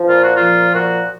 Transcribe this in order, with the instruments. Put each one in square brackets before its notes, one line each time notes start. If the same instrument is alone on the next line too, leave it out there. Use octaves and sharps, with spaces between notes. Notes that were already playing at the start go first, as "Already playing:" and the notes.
Already playing: [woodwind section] F3
A#2 F4
F#4
F3 F4
A#2 F#4